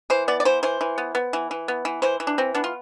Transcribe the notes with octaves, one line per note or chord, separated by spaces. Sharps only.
E3 C5
B3 D5
D5
E3 C5
E3 C5
E3
B3
B3
E3
E3
B3
E3
E3 C5
E3
D4
E3 C4
B3 D4
F4